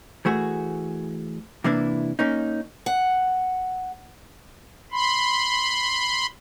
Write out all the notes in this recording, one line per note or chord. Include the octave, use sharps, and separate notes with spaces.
E3 A3 F#4 G#4
C3 E3 A#3 D4 E4
A#3 C#4 D#4
F#5
B5 C6